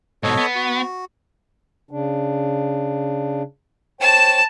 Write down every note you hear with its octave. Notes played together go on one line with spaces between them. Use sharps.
G#2 B2 A4 C#5 D#5
B3
F#4
C#3 D4
C5 C#5 G5 A5 E7